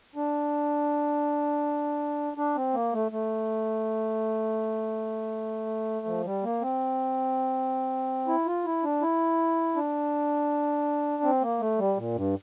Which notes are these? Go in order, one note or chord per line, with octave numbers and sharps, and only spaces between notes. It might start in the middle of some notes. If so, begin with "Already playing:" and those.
D4
D4
C4
A#3
A3
A3
F3
G3
A#3
C4
E4
F4
E4
D4
E4
D4
C4
A#3
A3
G3
A#2
G2